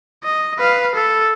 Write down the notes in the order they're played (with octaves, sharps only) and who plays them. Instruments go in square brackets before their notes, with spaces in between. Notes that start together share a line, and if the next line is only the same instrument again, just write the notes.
[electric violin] D#5
B4 F5
A4